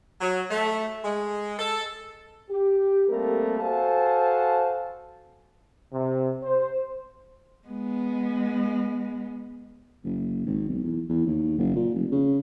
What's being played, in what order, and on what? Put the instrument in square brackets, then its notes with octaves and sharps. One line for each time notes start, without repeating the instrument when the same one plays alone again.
[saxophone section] F#3
A3
G#3
A4
[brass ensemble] G4
G3 A3 A#3 C4 A4 A#4
F#4 A4 C5 F5 G#5 A5
[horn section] C3
C5
[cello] G#3 B3
[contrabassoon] F#1
G#1
B1
E2
E2
D#2
F#1
A#2
F1
C#3